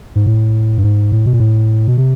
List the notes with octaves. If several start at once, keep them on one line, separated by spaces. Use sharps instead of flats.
G#2
A2
G2
G#2
A2
B2
A#2
A2
B2
C3